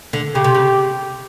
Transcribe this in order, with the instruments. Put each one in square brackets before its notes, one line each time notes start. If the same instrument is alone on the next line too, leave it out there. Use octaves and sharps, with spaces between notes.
[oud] D3
[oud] C#3 [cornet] G4
[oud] C3
C#3